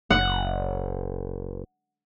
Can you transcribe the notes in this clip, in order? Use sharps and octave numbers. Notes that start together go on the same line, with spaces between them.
F#1 F#5